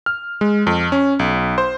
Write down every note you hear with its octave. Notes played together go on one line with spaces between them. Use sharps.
F6
G#3
F2
C#4
B1
C5